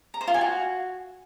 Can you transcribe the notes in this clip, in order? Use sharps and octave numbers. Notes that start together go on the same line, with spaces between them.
A#5
C5
F4
G#5
F#4